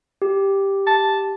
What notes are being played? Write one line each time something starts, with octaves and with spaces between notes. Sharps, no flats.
G4
A5